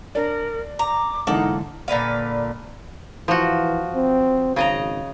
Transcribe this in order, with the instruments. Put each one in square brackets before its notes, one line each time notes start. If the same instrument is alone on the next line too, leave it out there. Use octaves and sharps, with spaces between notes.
[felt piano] D4 D5 [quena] A#4
[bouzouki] A#5 [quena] D6
[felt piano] G#2 D3 E3 [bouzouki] A#3 A4 F#5 [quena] D#4
[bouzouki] A#2 D3 B4 F5
[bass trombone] E3 [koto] F3 F#4
[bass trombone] C4
[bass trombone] G#1 [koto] C#3 D#5 A#5